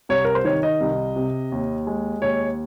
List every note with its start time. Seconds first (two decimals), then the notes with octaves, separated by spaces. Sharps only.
0.09 C2 C#5
0.25 A#4
0.35 C5
0.45 D#3 C#5
0.63 D#5
0.80 C2
1.16 C3
1.52 D#2
1.87 G#3
2.22 D#2 C#5